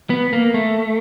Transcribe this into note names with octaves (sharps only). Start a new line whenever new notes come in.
B3
A#3
A3